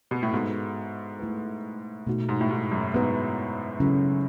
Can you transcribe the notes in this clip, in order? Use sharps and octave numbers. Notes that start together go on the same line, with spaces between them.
B2
A2
G#2 B3 F#4 A4
A3 E4 B4
B2 A3 D#4 F#4
G#2
A2
G#2
F#2
G#2 B3 F#4 B4
C#3 F#3 C#4 E4 A4